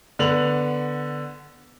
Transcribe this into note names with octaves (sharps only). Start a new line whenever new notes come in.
D3 B3 F7 F#7